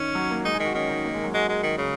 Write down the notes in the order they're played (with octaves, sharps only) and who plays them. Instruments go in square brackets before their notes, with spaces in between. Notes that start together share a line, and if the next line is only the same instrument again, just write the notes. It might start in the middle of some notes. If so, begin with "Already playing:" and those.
Already playing: [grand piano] D#3 [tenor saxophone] C#4
[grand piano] F#3
A#3
[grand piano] G#3 [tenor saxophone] D#4
[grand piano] G#4
[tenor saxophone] D#3
[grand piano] F#4
[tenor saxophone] D#3 [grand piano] C#4
[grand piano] D#4
A#3
G#3
F#3
[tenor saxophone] G#3 [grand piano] F#4
[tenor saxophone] G#3 [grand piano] G#4
[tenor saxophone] D#3
C#3